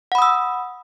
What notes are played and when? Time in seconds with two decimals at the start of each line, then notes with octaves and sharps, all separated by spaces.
0.12 F#5
0.15 B5
0.18 D#6
0.22 E6